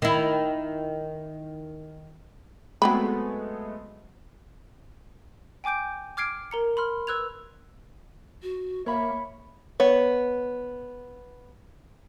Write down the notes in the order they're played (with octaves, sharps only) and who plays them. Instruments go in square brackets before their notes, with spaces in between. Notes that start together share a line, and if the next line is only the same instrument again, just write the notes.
[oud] D#3 E4
[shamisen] F#3 C4 B5 [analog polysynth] G#3 A3 B3
[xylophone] G5 G#5 D6 G6 D7
D6 F6 G#6 C7 D7
A#4 A#5 C#7
B5 C6 F6
B4 E6 F#6 G#6 F7
[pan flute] F#4
[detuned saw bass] A#3 [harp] C#5 B5 [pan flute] E5
[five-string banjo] B3 C#5